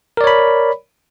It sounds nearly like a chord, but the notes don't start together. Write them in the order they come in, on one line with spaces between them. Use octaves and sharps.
A#4 D5 C#5 B5